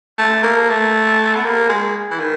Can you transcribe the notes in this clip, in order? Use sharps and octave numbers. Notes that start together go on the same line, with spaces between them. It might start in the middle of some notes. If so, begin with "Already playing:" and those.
A3
A#3
A3
B3
A#3
G#3
E3
D#3